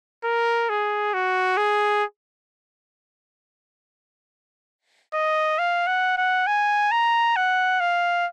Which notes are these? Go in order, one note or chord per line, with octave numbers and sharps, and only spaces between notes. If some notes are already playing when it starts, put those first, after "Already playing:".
A#4
G#4
F#4
G#4
D#5
F5
F#5
F#5
G#5
A#5
F#5
F5